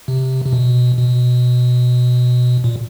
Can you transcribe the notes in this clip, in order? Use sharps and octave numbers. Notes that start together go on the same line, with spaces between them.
C3
C3
B2
B2
A#2